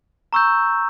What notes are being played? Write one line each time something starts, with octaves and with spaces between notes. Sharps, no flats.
A#5 C#6 E6 G6